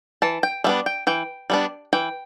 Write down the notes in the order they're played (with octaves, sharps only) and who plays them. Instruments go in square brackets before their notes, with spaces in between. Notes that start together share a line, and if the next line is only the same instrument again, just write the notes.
[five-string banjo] E3 A5
G5
G3 B3 D4 E5
G5
E3 G5
G3 B3 D4
E3 G5